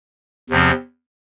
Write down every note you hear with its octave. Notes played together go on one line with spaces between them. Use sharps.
E2 C3 F3 C4